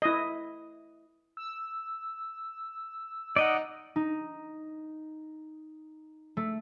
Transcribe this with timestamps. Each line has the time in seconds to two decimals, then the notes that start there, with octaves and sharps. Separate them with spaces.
0.02 E4 D#5
1.37 E6
3.36 D#4 D5 D#5 F#5
3.96 D#4
6.37 A3